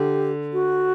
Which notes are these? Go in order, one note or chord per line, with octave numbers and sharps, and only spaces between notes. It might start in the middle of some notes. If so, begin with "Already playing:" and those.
Already playing: D3 G4
F#4